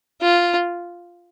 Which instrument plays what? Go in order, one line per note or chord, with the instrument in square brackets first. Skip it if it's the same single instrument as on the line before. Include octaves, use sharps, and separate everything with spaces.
[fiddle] F4